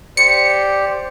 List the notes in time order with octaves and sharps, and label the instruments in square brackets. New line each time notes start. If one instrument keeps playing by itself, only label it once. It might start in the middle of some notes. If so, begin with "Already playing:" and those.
[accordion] G4 C5 D5 [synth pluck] C#7